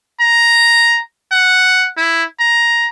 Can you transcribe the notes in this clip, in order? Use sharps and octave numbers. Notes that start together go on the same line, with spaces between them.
A#5
F#5
E4
A#5